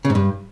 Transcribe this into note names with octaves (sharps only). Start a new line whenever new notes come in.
C#3
G#2
G2